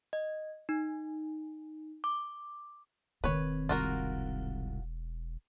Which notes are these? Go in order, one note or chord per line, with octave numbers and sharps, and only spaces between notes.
D#5
D#4
D6
E1 D#3 C4 B4 C#5
C2 G#2 F4 F#4 A#4